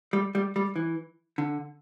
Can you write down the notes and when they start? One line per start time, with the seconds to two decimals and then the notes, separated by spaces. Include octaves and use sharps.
0.13 G3
0.35 G3
0.56 G3
0.76 E3
1.38 D3